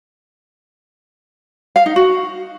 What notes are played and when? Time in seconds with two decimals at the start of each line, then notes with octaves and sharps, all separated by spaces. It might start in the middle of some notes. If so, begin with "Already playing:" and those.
1.76 F5
1.86 D#4
1.96 F#4